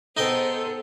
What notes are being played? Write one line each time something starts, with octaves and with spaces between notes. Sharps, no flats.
B3 D#4 G#4 A4 C5 D#5 G5